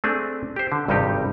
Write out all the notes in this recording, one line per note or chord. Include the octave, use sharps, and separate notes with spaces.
A3 C4 D4 G#4
G4 C5
D3
G#1 G2 C3 G3 D#4 G4